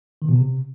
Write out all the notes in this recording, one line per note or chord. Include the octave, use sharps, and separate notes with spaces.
D#3
B2
C3